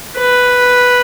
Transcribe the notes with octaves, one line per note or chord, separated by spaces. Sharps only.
B4